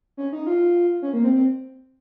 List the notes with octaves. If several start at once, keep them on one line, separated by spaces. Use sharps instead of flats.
C#4
D#4
F4
C#4
A#3
C4
C4